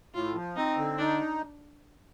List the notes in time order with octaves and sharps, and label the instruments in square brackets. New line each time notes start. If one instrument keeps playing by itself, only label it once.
[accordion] A2 [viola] F4
[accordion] F3
[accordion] C4 [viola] D#4
[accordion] D3
[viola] D4 [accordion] D#4